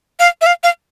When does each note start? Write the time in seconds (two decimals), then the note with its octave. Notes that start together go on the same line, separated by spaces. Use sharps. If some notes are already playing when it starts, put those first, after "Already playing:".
0.20 F5
0.41 E5
0.46 F5
0.64 F5